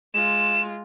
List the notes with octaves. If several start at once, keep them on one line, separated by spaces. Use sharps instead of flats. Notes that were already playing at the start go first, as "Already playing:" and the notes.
G#3 F4 E7